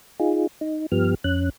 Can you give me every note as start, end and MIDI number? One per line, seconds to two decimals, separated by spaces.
0.20 0.47 63
0.20 0.47 65
0.20 0.47 68
0.61 0.86 63
0.92 1.15 43
0.92 1.15 53
0.92 1.15 59
0.92 1.15 67
0.92 1.15 89
1.24 1.50 41
1.24 1.50 61
1.24 1.50 90